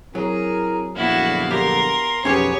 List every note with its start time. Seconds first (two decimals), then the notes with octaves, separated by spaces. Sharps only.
0.15 F#3 C4 E4 G#4 A#4
0.96 A#1 F#2 D3 B3 E4 F#4 F5
1.51 G4 A#4 C6
2.25 B1 F2 B3 C#4 G4 G#4 C#5 G#5